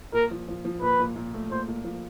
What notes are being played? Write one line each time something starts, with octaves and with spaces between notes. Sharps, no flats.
A#2 A#4
F3
F3
F3
A#2 B4
A#2
A#2
A3
A#2 C5
A#2
F3